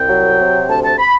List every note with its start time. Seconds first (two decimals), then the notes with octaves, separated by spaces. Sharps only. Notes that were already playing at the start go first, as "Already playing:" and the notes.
Already playing: C2 G5
0.09 F#3
0.40 C3
0.68 D2 A5
0.83 A5
0.99 B5